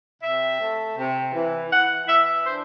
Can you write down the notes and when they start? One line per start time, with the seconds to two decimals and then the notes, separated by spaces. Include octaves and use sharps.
0.22 C3 E5
0.60 A3
0.96 C3
1.34 E3
1.70 E3 F#5
2.07 E3 E5
2.43 D4 C5